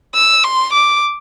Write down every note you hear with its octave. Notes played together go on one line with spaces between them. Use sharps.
E6
C6
D6